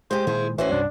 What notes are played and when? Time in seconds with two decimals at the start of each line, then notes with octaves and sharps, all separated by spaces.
0.11 G#3 G4 C5
0.27 A#2 D#3 G#3 E4 G#4
0.58 A1 E3 C#4 F#4 C5
0.71 C2 G2 C3 D4